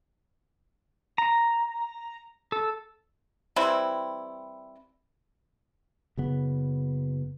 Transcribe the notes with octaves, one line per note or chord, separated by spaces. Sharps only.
A#5
A4
E3 G3 C4 E4
F#1 C#3 B3